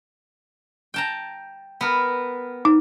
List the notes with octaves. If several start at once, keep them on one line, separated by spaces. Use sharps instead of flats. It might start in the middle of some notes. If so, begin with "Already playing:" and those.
G5 A5 A#5
B3 A#4
D#4